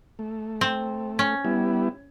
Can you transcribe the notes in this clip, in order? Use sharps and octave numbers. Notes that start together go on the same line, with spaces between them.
A3
C4
C#4
G3 B3 E4